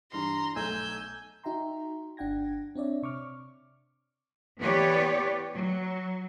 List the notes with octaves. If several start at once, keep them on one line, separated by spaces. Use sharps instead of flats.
G2 E3 A#5 C6 C7
B1 A3 G#5 A#5 E6 G6
D#4 F#4 E5 G5 A#5 C6
G1 D4 F#5 G5 G#6 A#6
C4 D4 C#5 D5 E5
C3 C#6 D6 F6
E3 B3 G4 B4 C#5 D5
F#3